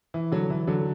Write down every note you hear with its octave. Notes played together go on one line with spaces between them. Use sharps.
E3
D3 F#3
E3
D3 F#3